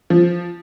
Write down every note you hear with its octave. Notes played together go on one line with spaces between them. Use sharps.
F3